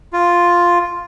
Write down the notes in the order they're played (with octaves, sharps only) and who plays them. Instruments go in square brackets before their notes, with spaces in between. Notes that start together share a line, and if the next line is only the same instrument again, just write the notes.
[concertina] F4